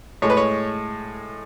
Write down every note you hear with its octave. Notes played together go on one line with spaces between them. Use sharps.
A2 G#3 C#5
B4
C#5